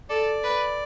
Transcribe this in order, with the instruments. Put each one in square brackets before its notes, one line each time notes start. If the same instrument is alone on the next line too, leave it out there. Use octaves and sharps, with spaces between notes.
[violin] A4 [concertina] D5
[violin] B4